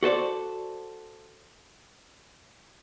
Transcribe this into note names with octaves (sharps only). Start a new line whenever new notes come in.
F#4 A4 C5 D5